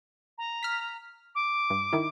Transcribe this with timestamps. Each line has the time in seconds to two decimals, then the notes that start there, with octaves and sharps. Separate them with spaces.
0.38 A#5
0.63 F6 B6
1.35 D6
1.70 G2
1.93 D#3 E4